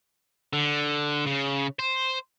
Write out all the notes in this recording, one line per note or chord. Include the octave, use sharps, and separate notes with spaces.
D3
C#3
C5